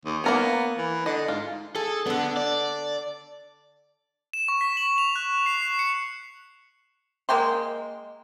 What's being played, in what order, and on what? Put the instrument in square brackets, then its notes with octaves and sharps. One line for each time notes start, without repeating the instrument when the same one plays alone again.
[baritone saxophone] D#2
[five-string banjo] A#3 A#4 C#5 [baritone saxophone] B3
[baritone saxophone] E3
[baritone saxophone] D3 [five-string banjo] D#5
[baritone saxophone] G#2 [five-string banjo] F4
[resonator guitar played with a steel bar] G#4 [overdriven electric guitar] A4
[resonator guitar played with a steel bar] D3 D4 [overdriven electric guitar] B3
[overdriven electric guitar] D5
[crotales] E7
C#6
B6
F#7
F7
F#6
E7
C7
C7
C#7
[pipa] G#3 A#3 G5 C6